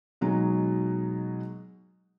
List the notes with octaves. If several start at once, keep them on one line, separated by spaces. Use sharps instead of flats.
B2 F#3 G#3 D#4